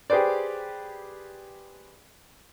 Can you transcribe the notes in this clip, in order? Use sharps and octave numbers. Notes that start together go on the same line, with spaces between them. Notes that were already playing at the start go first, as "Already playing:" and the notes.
G4 G#4 B4 C5 D5